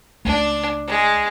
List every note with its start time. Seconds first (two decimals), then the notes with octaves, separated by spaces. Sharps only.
0.25 C#2 A3 D4
0.87 G#3